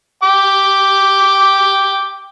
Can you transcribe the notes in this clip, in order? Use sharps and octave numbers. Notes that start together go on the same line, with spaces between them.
G5 D6